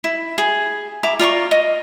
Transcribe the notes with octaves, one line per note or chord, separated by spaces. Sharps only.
E4
G#4
E4 A#5 D6
F4 D5 A#5 C#6
D#5